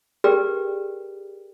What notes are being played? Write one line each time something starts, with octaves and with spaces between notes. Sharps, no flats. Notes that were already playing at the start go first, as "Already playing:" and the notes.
G4 G#4 A#4 B4 D5 G5